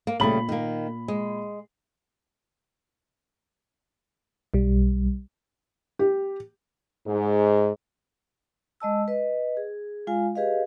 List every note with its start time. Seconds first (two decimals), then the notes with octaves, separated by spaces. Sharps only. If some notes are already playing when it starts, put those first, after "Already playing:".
0.07 A#3
0.20 A#2 C#3 G3 A3 B5 F#7
0.49 D#3 A#3
1.08 G#3
4.54 B1 G3
5.99 G4
7.07 G#2
8.80 G#3 D#5 A5 E6
9.08 B4 D#5
9.57 G#4
10.07 G#3 F4 F5 G#5
10.36 G4 G#4 B4 D#5 F5